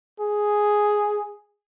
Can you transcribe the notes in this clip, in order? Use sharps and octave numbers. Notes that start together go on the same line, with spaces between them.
G#4